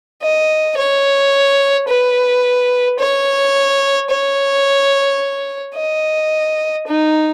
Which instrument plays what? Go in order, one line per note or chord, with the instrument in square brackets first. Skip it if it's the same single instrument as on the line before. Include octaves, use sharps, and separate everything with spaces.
[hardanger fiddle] D#5
C#5
B4
C#5
C#5
D#5
D#4